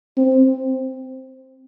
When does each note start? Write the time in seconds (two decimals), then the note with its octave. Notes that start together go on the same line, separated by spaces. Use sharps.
0.17 C4